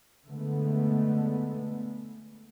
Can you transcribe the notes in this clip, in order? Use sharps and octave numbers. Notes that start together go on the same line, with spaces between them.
D3 G#3 A3 B3